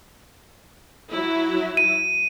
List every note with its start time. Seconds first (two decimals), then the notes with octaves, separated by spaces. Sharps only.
1.12 F#3 E4
1.77 D#7